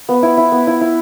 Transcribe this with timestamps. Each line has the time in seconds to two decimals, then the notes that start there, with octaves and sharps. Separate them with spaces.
0.09 B3
0.23 E4
0.37 E4
0.52 B3
0.67 E4
0.81 E4